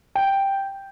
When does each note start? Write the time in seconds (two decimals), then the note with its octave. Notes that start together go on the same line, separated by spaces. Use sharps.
0.15 G5